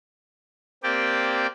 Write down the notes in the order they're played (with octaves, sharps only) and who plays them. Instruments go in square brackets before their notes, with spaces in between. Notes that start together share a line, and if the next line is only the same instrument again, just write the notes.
[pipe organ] A#3 C4 G4 D5 G5